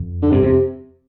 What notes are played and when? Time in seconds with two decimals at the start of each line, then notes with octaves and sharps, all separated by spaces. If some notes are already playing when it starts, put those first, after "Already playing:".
Already playing: F2
0.22 D3
0.31 G2 C3
0.42 F2
0.45 C3